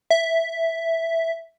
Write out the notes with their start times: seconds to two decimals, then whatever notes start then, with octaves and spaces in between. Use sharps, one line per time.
0.10 E5